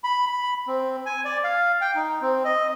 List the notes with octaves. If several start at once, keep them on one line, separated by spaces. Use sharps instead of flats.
B5
B5
C4
G#5
D5
F5
G5
D#4
C4
D#5